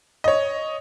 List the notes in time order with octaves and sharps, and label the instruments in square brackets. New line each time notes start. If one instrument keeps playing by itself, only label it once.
[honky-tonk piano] C#5 D#5